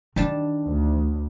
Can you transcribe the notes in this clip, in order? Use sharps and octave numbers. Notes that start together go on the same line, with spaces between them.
D#3 G3 D4 A5
D2